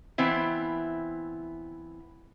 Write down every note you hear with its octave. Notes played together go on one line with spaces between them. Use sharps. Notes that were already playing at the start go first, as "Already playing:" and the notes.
E3 B3 C4 E4